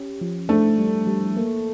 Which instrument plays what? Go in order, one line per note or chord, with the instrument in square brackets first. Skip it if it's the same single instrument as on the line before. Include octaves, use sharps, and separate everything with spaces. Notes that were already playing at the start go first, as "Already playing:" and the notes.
Already playing: [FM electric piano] C#4 G4
F3
[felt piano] A3 [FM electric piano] D4
[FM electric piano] G3
G3
A#3